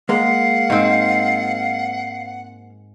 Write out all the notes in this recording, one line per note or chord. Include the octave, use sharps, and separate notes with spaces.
G#3 A#3 F5 F#5
G#2 C4